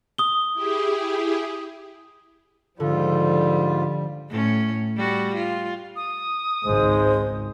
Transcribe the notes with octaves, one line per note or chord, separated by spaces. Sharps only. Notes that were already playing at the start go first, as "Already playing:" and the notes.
D#6 G7
E4 G4 G#4
G#2 D3 F3 G3 F4 A4
A2 C#4
G3 F#4
F4
D#6
G#1 C#2 D#3 G#3 C5